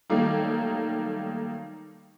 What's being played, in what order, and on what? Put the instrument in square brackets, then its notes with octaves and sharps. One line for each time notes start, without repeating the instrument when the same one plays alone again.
[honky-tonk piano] D#3 F#3 G3 A3 A#3 D#4